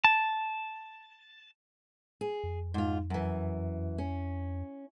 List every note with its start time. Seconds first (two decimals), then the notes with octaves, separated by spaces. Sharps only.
0.04 A5
2.21 G#4
2.44 F2
2.74 G#2 F4
3.10 F#2 E3
3.98 C#4